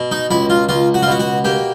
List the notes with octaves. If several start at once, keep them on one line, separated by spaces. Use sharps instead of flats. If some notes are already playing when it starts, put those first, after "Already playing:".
Already playing: B2
D#4
C#2 E4
F4
C#2 F4
F#4
F4
B2 F#4
F#4
A#3 G4